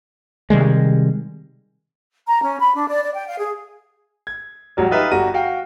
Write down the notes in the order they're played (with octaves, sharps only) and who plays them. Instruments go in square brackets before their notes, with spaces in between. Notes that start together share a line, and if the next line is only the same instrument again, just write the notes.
[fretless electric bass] C3 D#3 G3 G#3
[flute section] A#5
C#4
B5
D4
D5
D5
G5
F5
G#4
[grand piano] G#6
A1 F#3 G3
D#4 F4 G4 B4 E5
G1 G3 F#4 A#5 D#7
F#4 F5 G5